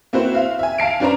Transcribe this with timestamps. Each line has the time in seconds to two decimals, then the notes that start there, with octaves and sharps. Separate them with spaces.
0.13 A#3 C4 E4 F#4 B4 C5
0.34 E5 F5
0.59 E5 G#5
0.78 F5 A5 C7 D7
1.00 C#4 D4 B4 C5 A#5